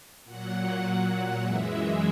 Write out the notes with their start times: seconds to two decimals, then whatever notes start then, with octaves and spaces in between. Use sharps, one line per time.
0.25 A#2 F#3 F#5
0.83 F#5
1.40 F#2 E3 G#3 E5